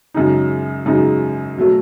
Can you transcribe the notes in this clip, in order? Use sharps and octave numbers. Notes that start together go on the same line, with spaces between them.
F#2 C#3 G#3 D#4
F#2 C#3 G#3 D#4
B2 F#3 A3